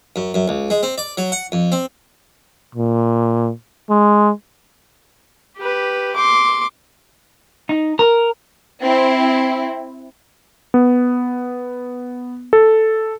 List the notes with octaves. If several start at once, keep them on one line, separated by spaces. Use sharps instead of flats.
F#2
F#2
C#2
G#3
C4
D5
F#3
F#5
F2
C4
A#2
G#3
G4 B4
C6 D6
D#4
A#4
C4 E4
B3
A4